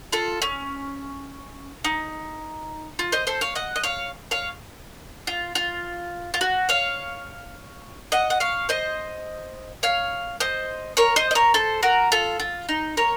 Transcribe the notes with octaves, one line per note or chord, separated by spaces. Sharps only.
F4 A4
C#4
D#4
F4
C5 D#5
A4 C5
C#5 F5
D#5 F#5
D#5
C#5 F5
C#5 F5
F4
F4
F4
F#4
C#5 F5
D#5 F#5
F#5
C#5 F5
C5 D#5
C#5 F5
C5 D#5
A#4 C#5
C5 D#5
D#5
A#4 C#5
A4 C5
F#4 A#4
F4 A4
F4
D#4
A#4 C#5